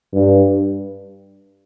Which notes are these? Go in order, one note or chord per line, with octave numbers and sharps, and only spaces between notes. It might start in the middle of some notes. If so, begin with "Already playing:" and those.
G2